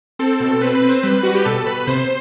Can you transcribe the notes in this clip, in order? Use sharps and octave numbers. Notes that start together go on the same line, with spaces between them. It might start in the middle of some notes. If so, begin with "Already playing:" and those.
C4 A4
B2
C4 B4
B4
C4
C5
G3 B4
G3 F#4
G4
B2 A4
B2 B4
C3 C5